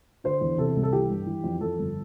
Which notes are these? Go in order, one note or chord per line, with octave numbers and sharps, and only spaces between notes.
D3 C5
E2
C3 A4
C2
A4
E3 G4
G2
E3
F2
F2 A4
G1